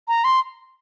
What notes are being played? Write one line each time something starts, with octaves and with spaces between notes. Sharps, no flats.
A#5
C6